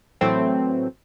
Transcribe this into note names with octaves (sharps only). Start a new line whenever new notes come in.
A2 E3 F#3 A3 C4